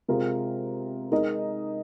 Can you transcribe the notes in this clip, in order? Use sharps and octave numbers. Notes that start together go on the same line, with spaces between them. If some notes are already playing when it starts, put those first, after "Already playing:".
C3 G#3 F4 A#4
G#3 D#4 A#4 D#5